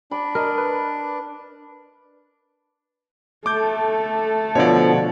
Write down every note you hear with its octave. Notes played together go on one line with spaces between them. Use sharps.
D4 B5
A#4 D#5
B4
A3 A4 D6 G6
B2 D3 F3 C#5 D5